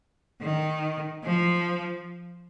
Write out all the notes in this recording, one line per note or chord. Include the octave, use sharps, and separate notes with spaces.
D#3
F3